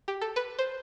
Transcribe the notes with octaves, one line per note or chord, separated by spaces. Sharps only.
G4
A4
B4
C5